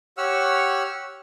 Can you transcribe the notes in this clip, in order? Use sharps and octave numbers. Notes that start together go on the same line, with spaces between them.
G4 C#5 F#5 E6 F6